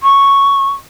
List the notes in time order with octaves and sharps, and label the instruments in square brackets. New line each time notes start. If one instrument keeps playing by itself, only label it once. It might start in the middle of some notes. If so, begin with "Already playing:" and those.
[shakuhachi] C#6